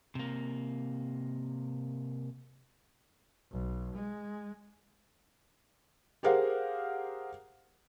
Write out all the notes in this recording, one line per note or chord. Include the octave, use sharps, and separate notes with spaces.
C3 A#3
B1
G#3
G4 G#4 A#4 C5 F5 F#5